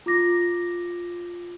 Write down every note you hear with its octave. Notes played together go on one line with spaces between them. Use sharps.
F4 D6 A#6